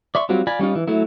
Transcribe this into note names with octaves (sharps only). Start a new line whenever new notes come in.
D5 E5 C6 C#6
F#3 G3 C4 F4 F#4
F4 D5 G#5 B5
G3 C#4 D#4 F4
E3
F#3 A3 E4